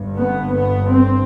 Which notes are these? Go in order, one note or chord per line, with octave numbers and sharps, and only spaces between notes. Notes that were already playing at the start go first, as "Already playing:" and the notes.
Already playing: G1 G2
B3
B3
C4